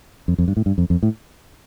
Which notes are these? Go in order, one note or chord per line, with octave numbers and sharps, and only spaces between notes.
F2
F2
G2
A2
G2
F2
F2
A2